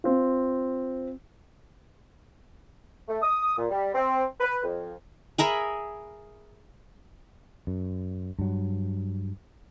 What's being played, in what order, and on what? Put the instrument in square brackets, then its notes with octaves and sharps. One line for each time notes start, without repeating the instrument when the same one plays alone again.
[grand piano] C4 F4
[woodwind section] A3
D#6
A#2
G3
C4
B4
F2
[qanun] G#4 A#4 E5 B5
[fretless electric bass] F#2
G2 F#3